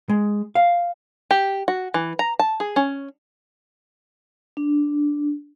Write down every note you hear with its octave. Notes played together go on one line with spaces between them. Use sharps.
G#3
F5
G4
F#4
E3
A#5
A5
G#4
C#4
D4